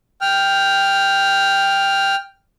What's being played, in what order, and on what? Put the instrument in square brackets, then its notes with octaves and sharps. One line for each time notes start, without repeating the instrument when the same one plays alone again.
[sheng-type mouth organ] G5 F6